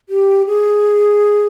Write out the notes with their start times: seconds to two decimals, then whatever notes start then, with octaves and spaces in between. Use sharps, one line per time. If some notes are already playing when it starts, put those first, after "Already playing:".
0.09 G4
0.47 G#4